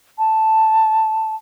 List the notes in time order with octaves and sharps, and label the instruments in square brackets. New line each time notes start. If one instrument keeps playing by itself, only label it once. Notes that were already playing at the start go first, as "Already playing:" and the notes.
[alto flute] A5